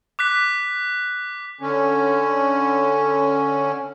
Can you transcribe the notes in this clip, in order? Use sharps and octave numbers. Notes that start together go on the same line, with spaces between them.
D6 F#6 B6
D3 C#4